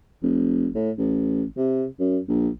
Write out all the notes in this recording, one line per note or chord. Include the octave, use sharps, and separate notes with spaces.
F1
A2
A1
C3
F#2
A#1